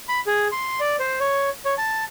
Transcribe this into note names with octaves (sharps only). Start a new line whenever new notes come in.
B5
G#4
C6
D5
C5
C#5
C#5
A5